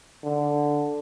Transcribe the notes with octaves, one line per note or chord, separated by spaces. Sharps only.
D3